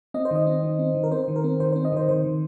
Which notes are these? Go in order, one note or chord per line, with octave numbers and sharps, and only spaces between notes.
C4 D#5
C5
D#3 D#5
C4
D#3
C4
D#3
A#4
C4 C5
D#3
A#4
C4
D#3 C5
C4 C5
D#5
D#3 C5
D#3 C5
D#3